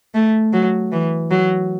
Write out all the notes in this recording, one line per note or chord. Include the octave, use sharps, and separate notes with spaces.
A3
F#3
E3
F#3